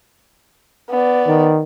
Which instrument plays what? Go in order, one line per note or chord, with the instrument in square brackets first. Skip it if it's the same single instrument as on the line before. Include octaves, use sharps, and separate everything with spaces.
[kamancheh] B3 D5
[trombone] D#3